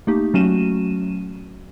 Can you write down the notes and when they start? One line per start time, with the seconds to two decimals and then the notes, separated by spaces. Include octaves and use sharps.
0.07 A3 A#3 D#4 G4
0.34 F#3 A3 C#4 F#4 D#7 E7